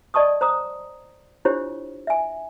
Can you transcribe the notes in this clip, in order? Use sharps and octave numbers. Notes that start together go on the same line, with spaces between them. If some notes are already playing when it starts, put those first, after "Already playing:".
D5 D#5 A5 C#6 D#6
C5 A#5 D#6
D4 E4 F4 G4 C5 C#5
E5 G#5